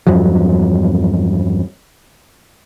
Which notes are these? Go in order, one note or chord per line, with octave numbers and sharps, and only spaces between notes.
E2 G2 F3 F#3